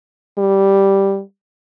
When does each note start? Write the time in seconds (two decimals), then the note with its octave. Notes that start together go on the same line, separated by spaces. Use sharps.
0.38 G3